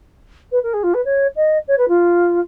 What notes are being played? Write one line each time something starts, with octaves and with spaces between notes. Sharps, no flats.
B4
A#4
G#4
F4
B4
C#5
D#5
C#5
B4
F4